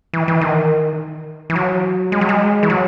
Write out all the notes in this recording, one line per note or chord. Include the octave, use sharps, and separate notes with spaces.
E3
E3
D#3
E3
F#3
G#3
F#3
G#3
E3
F#3